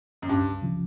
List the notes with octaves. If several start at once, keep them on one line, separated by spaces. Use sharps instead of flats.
F#2
C#2 G2
C#3 F3